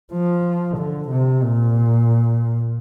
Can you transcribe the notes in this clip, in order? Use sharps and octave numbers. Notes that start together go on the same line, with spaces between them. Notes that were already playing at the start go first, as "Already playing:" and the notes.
F3
D3
C3
A#2